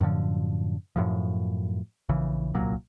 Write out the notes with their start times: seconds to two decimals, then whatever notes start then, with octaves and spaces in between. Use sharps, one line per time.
0.01 F#2 A2 D3 F3
0.96 F#2 A2 F3
2.09 A#1 C#3 E3
2.54 D1 C2 A#2 F#3